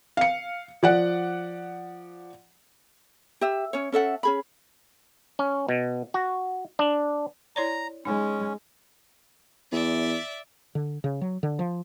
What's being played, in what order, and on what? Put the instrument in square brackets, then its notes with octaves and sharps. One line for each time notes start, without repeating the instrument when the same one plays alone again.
[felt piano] F5 C#7
F3 D5 F#5
[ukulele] G4 E5
C#4 C#5
C#4 A4 E5 F#5
C#4 G#4 B5
[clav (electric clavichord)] C#4
B2
F#4
D4
[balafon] E4 C#5 D5 [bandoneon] A#5
[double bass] G#3 [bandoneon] C#4 [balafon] D#4
[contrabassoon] E2 [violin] D5 E5
[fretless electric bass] D3
C#3
F#3
D3
F3